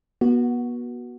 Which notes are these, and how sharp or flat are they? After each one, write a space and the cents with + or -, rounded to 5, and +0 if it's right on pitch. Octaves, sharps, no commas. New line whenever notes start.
B3 -35 F#4 +0